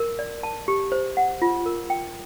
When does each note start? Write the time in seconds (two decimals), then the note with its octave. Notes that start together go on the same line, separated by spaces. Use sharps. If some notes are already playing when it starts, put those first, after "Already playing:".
Already playing: A#4
0.19 D5
0.43 A5
0.68 G4
0.92 C5
1.17 F#5
1.42 F4
1.66 A#4
1.90 G5